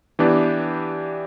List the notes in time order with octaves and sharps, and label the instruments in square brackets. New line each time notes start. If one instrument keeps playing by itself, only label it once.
[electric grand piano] E3 B3 D4 G4